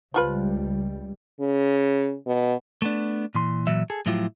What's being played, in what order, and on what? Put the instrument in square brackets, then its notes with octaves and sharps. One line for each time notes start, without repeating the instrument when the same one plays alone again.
[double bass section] C#2 G3 [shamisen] F3 F4 B4
[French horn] C#3
B2
[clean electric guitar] A3 B3 D4
A#2 E3 C6
A#2 E3 F#3 E5
G#4 A4
A2 F3 F#3 E4 F4 G4